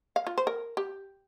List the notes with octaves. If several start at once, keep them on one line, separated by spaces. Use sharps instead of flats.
F5
F4
C5
A#4
G4